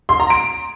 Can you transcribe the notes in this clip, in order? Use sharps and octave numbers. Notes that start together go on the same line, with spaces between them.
C6
A#5
D7